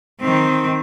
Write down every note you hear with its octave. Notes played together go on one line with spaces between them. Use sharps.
D#3 C4